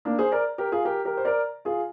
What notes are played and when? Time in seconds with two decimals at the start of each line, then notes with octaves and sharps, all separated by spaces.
0.05 A#3 D4
0.19 G#4 C5
0.32 A#4 D5
0.58 G4 A#4
0.72 F4 G#4
0.85 G4 A#4
1.05 G4 A#4
1.17 C5
1.25 A#4 D5
1.65 F4 G#4